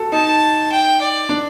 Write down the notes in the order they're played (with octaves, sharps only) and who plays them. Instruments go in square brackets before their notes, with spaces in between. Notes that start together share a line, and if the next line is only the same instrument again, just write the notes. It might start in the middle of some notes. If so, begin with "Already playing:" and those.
Already playing: [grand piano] F#4 A4
[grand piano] D#4 [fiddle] A5
[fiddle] G5
D5
[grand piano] D4